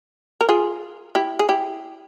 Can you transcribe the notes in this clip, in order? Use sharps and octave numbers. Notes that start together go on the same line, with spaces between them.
A#4
F4 G#4
E4 G4
G#4
E4 G4